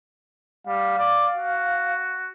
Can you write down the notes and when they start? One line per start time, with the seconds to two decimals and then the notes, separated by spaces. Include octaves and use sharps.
0.67 G3 F5
0.98 D5
1.36 F#4